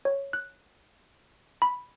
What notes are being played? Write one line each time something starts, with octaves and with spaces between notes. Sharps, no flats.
C#5
F#6
B5